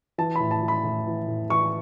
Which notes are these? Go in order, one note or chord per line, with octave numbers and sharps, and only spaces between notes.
E3 A5
A2 B5
A5
E3
B5
A2
E3
A2
E3 C#6